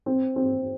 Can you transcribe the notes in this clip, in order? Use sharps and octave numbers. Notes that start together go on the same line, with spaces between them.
C4
C4